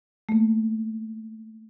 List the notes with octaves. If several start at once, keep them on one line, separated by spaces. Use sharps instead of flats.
A3 A#3